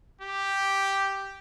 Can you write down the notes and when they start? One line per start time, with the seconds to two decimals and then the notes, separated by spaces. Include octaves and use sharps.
0.21 G4